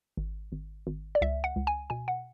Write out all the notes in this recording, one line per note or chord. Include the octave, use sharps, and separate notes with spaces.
G#1
G#1
G#1
D5
C#2 E5
F#5
C#2
G#5
B2 G#5
F#5